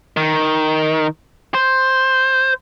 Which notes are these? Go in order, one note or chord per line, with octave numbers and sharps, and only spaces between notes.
D#3
C5